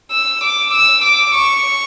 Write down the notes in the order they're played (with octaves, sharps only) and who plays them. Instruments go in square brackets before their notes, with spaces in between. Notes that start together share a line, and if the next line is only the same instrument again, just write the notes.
[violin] E6
D6
E6
D6
C#6